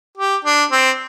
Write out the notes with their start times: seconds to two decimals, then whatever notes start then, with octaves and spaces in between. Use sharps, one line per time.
0.18 G4
0.45 D4
0.72 C4